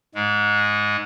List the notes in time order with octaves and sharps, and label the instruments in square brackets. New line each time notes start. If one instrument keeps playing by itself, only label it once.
[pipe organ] G#2 G#3